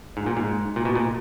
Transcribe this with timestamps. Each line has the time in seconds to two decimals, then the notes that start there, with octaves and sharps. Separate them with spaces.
0.17 G#2
0.26 A#2
0.37 G#2
0.76 A#2
0.85 B2
0.95 A#2